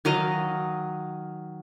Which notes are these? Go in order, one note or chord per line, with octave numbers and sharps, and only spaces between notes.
D#3 F#3 D#5 F5